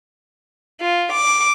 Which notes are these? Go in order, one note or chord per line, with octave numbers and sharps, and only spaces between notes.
F4
D6